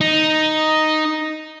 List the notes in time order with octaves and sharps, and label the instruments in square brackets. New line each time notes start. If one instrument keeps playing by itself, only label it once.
[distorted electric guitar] D#4